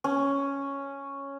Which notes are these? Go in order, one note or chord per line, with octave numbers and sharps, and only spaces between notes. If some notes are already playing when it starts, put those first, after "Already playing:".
C#4